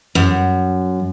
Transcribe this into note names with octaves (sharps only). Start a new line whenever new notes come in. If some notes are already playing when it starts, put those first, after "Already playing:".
F#2